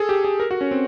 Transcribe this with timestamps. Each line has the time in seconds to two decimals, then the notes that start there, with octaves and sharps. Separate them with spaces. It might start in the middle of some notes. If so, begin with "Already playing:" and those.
Already playing: G#4 A4
0.09 G4
0.24 G#4
0.40 A#4
0.51 F#4
0.61 C#4
0.71 C4